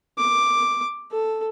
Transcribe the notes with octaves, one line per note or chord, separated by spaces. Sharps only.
D6
A4